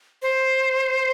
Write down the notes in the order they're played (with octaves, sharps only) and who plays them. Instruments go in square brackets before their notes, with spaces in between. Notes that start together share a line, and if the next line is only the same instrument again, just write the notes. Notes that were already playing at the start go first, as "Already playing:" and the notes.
[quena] C5